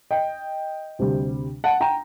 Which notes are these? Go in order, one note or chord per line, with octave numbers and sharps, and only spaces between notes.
D#5 G5
D2 C3 G3
F#5 A5
G5 A#5